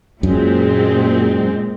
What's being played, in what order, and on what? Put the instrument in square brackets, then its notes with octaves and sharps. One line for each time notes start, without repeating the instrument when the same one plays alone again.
[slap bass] F#2 [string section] A#2 G#3 C4